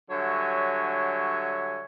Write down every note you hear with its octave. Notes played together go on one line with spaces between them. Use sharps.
D3 F#3 G3 C#5 E5 G#5